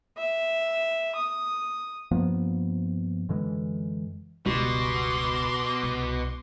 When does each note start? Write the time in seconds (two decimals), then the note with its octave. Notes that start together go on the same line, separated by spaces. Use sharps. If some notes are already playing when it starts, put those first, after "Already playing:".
0.17 E5
1.15 D#6
2.11 G2 F3 A#3 B3
3.29 F#2 D3 E3 G#3
4.46 E1 C#2 B2 G3 C6 D6
5.83 C2